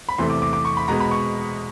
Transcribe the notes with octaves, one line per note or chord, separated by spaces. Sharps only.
B5
E2 C3 E3 A3 C6
D6
D6
D6
C#6
B5
B2 G#3 B3 A#5
B5
C#6